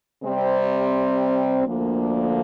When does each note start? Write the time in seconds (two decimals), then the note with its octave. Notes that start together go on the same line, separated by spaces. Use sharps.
0.24 C3 G3 C4
1.66 D2 D3 F3 A#3